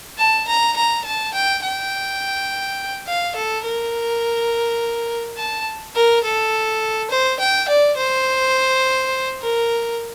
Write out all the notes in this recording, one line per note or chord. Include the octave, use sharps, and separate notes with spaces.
A5
A#5
A#5
A5
G5
G5
F5
A4
A#4
A5
A#4
A4
C5
G5
D5
C5
A#4